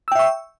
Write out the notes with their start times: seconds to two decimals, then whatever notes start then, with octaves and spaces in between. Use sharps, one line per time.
0.08 E6
0.12 G5
0.15 E5
0.19 C#6